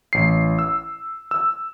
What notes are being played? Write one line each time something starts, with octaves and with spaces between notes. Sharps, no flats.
A1 C7
E6
E6